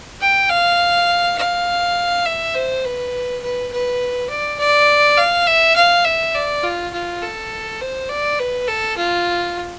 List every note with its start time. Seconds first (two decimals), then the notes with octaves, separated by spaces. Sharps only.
0.21 G5
0.50 F5
1.38 F5
2.25 E5
2.55 C5
2.84 B4
3.43 B4
3.72 B4
4.30 D5
4.59 D5
5.18 F5
5.48 E5
5.76 F5
6.05 E5
6.35 D5
6.63 F4
6.93 F4
7.22 A4
7.81 C5
8.09 D5
8.40 B4
8.68 A4
8.97 F4